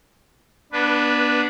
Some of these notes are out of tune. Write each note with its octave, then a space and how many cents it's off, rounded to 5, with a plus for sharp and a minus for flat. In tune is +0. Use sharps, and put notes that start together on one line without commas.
B3 -25 D4 +0 B4 +0